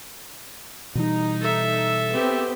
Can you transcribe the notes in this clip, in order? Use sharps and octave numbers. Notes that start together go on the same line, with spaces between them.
B2 E3 G3 D#4
A4 E5
B3 C4 G4